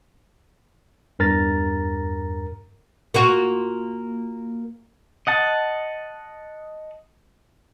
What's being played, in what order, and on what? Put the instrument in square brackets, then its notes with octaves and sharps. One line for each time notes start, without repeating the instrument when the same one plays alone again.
[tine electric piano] E2 G2 A#4 A#5 A6
[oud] A#3 F4 F#4
[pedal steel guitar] D#5 F#5 A5